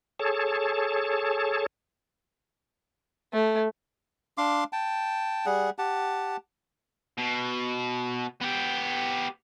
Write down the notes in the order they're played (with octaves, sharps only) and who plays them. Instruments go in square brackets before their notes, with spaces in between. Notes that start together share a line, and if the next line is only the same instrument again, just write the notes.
[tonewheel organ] G#4 A4 C#5 A5
[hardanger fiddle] A3
[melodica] D4 F5 C6 D6
G5 A5
G3 G#4 F#5
G4 F#5 A5
[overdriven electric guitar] B2
B3 G4